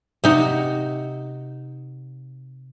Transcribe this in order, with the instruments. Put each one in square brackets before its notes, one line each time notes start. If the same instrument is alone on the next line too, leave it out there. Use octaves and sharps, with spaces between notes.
[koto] C3 D#4 F#4